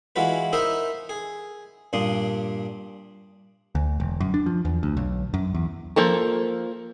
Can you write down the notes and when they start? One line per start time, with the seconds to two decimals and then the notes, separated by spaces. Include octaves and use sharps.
0.16 E3 G#3 F4 F#4 B4
0.53 D#4 A#4 C5 D#5 E5 B5
1.09 G#4
1.93 G2 A#2 D4 C6 D#6
3.75 D2
4.00 E1
4.20 F#2
4.34 D4
4.46 F3
4.65 E2
4.83 D2
4.97 B1
5.34 F#2
5.55 E2
5.96 F3 A#3 A4 A#4